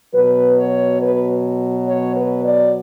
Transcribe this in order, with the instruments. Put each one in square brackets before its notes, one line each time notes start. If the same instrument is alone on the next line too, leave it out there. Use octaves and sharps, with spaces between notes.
[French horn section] B2 F#3 B4
C#5
B4
C#5
B4
D5